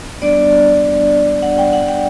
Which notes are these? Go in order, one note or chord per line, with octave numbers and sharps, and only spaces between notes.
G3 B3 D4 D5
F#5
G5
F#5
G5